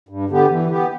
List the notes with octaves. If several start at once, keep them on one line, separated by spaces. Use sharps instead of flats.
G2
D3 B3 G4
E3
B3 G4